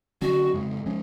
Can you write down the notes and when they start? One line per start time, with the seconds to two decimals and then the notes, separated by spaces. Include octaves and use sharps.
0.21 D3 F#3 C#4 F#4
0.54 F2 C#3 G#3
0.86 F3 G#3 C#4